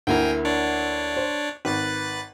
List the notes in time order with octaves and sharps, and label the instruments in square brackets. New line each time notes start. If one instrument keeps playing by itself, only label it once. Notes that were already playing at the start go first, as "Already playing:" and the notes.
[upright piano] D2 A#3 E4 [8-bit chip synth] G5 G#5 A#5
[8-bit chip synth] D4 C#5 D5
[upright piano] C5
[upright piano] G#1 [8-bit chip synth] B4 F#6 A6